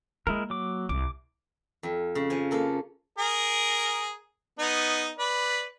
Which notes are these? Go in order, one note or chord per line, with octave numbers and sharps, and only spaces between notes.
G#3 A#3 E4 A#4
F#3 D6
C2 D6
F2
C#3
F3 G#5
A#3 A4 A#4
G#4 A#4
B3 D#4
B4 D5